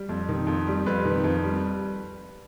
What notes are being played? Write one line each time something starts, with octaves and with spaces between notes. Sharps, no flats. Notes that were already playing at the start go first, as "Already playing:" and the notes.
Already playing: G3
F2
D#3
F2
G3
F2 B4
D#3
F2
G3